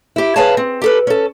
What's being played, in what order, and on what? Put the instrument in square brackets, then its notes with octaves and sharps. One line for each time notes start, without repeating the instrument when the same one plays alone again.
[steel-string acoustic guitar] E4 G4
G#4 B4 C#5 F5 G#5 A5
C4
G4 A4 B4
C#4 A4